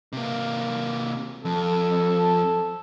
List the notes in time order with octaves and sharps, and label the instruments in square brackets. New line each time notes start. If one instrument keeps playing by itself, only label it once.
[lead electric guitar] C3 A#3
[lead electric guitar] F2 [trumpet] A4